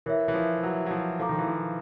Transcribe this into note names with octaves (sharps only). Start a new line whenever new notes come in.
E3 A#4 C#5 E5
E3
F3
F#3
F#3
F3
F3 A4 C5 F5 A#5 D6
D#3
E3
F3